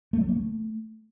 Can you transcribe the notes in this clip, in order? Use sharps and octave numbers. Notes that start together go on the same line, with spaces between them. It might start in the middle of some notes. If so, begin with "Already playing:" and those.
A3
F#3
A#3
A3